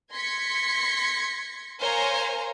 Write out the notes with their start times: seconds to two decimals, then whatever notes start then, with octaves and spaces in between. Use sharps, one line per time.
0.12 C6 G#6 A#6 B6 C#7
1.80 A#4 C5 C#5 F5 G#5 A#5